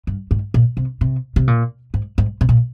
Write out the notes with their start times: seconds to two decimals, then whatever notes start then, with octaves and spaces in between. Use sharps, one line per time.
0.07 G2
0.31 G#2
0.54 A#2
0.77 C3
1.01 C3
1.36 C3
1.47 A#2
1.94 G#2
2.18 G#2
2.41 C3
2.49 A#2